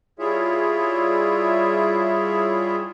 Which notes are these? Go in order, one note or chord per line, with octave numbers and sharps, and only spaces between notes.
G3 E4 F4 G#4 C#5 E5